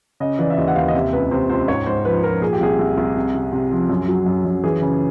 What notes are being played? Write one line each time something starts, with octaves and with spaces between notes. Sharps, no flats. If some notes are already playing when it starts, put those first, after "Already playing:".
C#3 D#5
E3 D5
E5
D#2 D#5
F#5
D#2 F5
D#5
C3 E5
C#2 B4
C3 C5
C#2 C5
G#2 C#5
G#2 C5
F3 B4
F3 A#4
A#2 G#4
G4
C2 G#4
C2
C2
C3
C3
C3
F3
F#2
F#3
F#2
F#2
E3 G#4
C#3